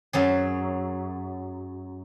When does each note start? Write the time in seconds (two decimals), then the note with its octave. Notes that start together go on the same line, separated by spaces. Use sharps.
0.13 F#2 F#3 G#4